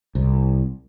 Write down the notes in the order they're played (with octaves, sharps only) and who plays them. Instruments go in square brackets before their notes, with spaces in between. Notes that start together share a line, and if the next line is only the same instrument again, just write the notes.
[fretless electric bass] C2